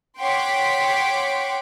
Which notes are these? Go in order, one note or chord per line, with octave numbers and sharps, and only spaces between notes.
C#5 F#5 G5 C6 D6 B6